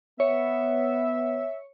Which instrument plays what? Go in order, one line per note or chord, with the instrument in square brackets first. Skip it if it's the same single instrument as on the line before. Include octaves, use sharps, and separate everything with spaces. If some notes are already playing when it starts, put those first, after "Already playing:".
[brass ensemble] B3 [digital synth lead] C#5 [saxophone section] E5